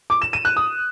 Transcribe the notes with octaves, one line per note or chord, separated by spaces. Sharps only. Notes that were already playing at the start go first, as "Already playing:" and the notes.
D6
E7
D#7
F#6
D#6